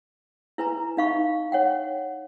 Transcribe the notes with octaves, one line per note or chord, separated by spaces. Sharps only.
E4 B4 G#5 A#5
D#4 D#5 F5 B5 C#6
C#5 F#5 G5